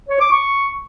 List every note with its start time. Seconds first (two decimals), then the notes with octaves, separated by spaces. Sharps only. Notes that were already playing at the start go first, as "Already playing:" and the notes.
0.09 C#5
0.20 D6
0.31 C#6